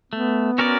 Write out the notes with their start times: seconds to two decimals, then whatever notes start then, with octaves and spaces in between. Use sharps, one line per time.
0.12 A3 B3
0.58 C#4 F#4 A#4 D5